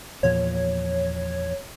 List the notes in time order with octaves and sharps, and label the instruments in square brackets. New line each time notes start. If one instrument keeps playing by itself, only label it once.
[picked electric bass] E2 A#2 F3 [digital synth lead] C#5